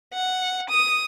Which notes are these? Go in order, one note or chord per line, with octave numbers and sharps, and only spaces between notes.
F#5
D#6